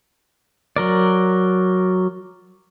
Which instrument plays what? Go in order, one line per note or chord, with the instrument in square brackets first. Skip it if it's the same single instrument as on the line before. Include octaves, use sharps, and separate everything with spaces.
[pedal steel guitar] F#3 A#4 D5